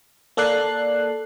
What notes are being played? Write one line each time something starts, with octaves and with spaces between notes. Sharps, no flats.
A#3 A4 D5 F#6 C7